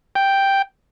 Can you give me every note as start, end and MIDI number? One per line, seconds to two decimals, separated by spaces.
0.15 0.62 79